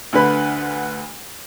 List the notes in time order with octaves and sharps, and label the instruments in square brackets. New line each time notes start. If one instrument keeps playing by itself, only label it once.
[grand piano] D2 D3 B4 B5